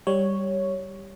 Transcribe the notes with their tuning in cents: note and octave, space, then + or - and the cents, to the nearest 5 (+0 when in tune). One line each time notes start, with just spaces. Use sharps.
G3 +0 C#5 +0